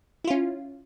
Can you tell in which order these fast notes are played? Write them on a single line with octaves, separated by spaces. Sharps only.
E4 F4 C#4